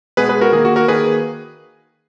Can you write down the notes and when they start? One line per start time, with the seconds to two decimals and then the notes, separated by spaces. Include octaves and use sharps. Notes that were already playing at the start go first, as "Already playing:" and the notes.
0.17 B2 G#3 B3 G#4 B4
0.29 G#4 B4
0.41 F#4 A#4
0.52 D#3 A#3 G#4
0.65 F#4
0.76 F#4 A#4
0.88 D#3 A#3 G#4 B4